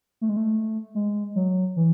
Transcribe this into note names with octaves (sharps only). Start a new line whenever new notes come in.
A3
G#3
A3
G#3
F#3
E3